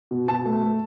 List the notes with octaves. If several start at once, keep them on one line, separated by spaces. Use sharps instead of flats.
B2
B2 A5
A3
A3